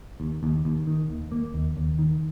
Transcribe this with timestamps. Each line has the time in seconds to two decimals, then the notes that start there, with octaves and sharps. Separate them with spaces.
0.20 D#2
0.43 D#2
0.65 D#2
0.87 D#3
1.09 D#2
1.32 A#3
1.54 D#2
1.77 D#2
1.99 D#3